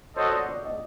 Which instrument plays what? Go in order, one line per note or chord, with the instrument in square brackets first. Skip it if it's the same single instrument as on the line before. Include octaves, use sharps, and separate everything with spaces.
[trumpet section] F#4 A4 C5 D#5 [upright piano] C#5
[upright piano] D5
D5
D#5